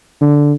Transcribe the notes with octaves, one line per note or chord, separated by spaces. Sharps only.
D3